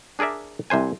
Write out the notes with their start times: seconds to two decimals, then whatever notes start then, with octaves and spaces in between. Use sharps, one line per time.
0.19 D4 G#4 A#4 D5 E5
0.70 C2 C3 C5 G#5